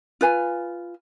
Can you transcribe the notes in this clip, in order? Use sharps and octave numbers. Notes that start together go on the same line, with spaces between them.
F4 B4 G#5